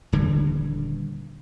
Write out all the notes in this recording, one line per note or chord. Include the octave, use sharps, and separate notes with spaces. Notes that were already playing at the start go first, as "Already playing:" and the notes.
D#1 D3 E3 G3